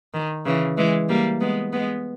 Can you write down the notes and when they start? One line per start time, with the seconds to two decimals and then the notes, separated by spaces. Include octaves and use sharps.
0.14 D#3
0.45 C#3 E3
0.77 E3 G#3
1.09 G3 A#3
1.41 G#3 B3
1.73 G#3 B3